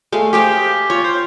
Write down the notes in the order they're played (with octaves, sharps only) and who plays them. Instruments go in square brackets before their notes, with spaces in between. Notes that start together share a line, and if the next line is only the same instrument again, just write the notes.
[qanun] G#3 A3 F5
[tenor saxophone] G4 [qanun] G#4 C5 F5
[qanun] F4 [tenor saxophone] C#5
[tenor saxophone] C5